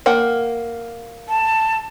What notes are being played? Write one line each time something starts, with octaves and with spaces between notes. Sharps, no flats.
A#3 F#5 G5
A5